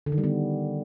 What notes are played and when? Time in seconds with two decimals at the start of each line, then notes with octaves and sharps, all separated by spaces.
0.06 D3
0.12 D#3
0.18 G3
0.24 B3